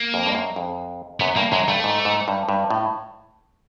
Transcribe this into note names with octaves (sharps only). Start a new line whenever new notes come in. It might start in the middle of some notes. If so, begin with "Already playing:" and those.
Already playing: A#3
F2
G2
F#2
F2
F#2 B3
G2 A#3
F#2 G#3
G2 A3
G#2
G#2
G2
G2
A2